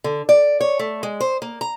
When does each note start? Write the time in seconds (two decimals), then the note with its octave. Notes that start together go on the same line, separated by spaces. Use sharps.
0.04 D3
0.29 D5
0.61 C#5
0.79 A3
1.03 G#3
1.21 C5
1.42 A#3
1.61 A#5